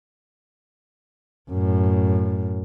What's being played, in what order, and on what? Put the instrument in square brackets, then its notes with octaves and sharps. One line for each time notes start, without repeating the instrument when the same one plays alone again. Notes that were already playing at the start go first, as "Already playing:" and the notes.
[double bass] F#2 A2